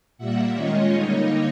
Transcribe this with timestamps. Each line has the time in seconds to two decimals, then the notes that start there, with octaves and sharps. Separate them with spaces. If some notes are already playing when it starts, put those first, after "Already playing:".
0.18 A#2 G3 A#3 E5 F#5
0.55 D#3 G#3 C#4 F4 C#5 D#5
0.92 D3 G3 A#3 D#4